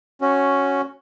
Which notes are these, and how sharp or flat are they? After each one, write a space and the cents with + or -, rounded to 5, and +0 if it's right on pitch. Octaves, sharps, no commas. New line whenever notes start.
C#4 +0 F#4 +0